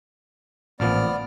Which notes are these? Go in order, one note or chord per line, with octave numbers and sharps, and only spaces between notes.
A1 A#2 F3 B3 D5 F6